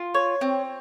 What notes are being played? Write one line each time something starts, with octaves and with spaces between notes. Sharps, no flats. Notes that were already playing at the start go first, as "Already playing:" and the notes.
Already playing: F4
C#5
C4